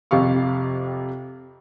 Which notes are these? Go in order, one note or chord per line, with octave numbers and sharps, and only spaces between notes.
F2 C3 G4 F5 C#6